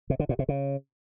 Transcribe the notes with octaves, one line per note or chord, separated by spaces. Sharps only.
C3
D3
A#2
C3
C#3